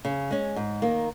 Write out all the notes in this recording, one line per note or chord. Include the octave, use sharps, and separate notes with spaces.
C#3
G#3 C#4
G#2
D#3 A#3